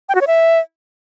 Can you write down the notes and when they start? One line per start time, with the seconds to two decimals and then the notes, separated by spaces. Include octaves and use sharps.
0.09 G5
0.15 F#4
0.21 C#5
0.27 E5